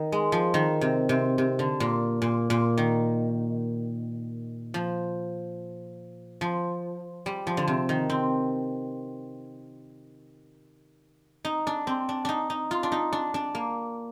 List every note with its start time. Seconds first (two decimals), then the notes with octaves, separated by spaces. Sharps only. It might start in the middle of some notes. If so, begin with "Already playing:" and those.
Already playing: D#3
0.12 G#3
0.32 F3
0.54 D#3
0.81 C3
1.09 C3
1.38 C3
1.59 D3
1.80 A#2
2.22 A#2
2.50 A#2
2.78 D#3
4.74 F3
6.41 F3
7.26 G3
7.47 F3
7.57 D3
7.68 C3
7.89 D#3
8.10 C4
11.45 D#4
11.67 D4
11.87 C4
12.09 D4
12.25 D4 D#4
12.50 D#4
12.71 F4
12.83 D4
12.92 D#4
13.13 D4
13.34 D4
13.55 A#3